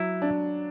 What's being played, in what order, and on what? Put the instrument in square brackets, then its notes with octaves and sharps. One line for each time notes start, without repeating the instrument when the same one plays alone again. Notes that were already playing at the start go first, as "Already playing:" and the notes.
Already playing: [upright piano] F#3 [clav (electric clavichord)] E4
[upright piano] D4